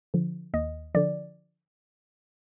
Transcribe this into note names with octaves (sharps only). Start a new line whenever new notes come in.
D3 F3
D#2 D#5
D3 F3 D5